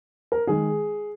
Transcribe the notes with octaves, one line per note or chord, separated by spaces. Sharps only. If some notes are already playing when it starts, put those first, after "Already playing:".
A#4
D#3 G#3 G#4